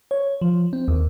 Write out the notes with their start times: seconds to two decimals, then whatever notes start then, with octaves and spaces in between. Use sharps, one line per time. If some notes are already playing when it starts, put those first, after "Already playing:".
0.11 C#5
0.41 F3
0.73 C4
0.88 D#2